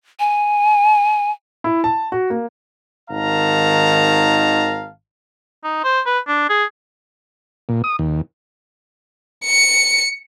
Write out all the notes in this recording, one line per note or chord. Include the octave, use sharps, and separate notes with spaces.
G#5
E4
A5
F#4
A#3
G#1 D#3 F5 F#5 A5 A#5
D#4
C5
B4
D4
G#4
A#2
D#6
D#2
C#7